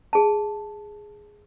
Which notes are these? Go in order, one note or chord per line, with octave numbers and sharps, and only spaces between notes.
G#4 A5